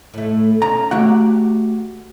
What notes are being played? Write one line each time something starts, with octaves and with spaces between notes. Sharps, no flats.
A2 A3
C#4 A#5
A3 F#4 G4 F#5